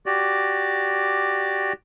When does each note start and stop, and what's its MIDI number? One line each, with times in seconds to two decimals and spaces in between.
0.06 1.73 66
0.06 1.73 67
0.06 1.73 74